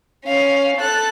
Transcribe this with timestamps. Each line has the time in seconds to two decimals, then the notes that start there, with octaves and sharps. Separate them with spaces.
0.25 C#4 F5
0.77 A4 F#6